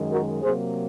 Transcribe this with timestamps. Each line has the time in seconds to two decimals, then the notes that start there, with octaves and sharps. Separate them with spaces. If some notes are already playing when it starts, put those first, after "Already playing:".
Already playing: F#2 D#3 G#3
0.11 F#4 A#4
0.42 C3 F#3 A#3 G#4 C5